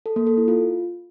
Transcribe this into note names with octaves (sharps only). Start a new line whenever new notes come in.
A4
A#3
A4
E4
F4